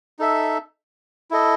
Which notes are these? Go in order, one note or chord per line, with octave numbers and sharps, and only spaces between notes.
D#4 A4 E5
E4 A4 D#5